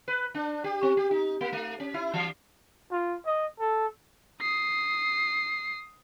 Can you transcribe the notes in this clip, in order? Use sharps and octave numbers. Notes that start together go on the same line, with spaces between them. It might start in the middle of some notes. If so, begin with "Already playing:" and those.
B4
D4
G4
C4
G4
D#4
A#3
A3
C#4
E4
E3
F4
D#5
A4
D#6 C7